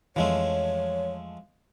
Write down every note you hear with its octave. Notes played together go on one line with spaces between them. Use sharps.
F2 E3 F3 G#3 A3 C#5